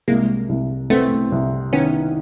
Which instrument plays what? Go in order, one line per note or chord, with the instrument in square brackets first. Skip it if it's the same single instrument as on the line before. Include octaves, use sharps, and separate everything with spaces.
[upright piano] C2 [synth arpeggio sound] G#3 A#3
[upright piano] C2
[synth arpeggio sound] A3 B3 [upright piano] C4
[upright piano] C2
[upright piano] D#3 [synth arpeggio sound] B3 C#4